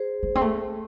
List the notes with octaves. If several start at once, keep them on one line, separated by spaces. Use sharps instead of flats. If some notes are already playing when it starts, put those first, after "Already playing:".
Already playing: G#4 C5
A3
C4
A3